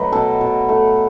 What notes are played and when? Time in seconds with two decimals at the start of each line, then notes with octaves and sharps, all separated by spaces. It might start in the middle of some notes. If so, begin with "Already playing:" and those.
Already playing: F#3 A3 B4 D#5 F#5
0.12 B2 A4
0.41 B2
0.69 A3